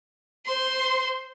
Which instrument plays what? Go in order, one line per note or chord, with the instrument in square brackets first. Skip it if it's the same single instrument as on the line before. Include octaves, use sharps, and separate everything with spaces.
[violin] C5 C6